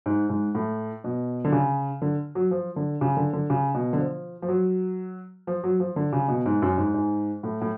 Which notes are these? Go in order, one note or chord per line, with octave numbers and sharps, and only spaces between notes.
G#2
G#2
A2
B2
D3
C#3
D3
F#3
F3
D3
C#3
D3
D3
C#3
B2
D3
F3
F3
F#3
F3
F#3
F3
D3
C#3
B2
G#2
F#2
G#2
G#2
A2
A2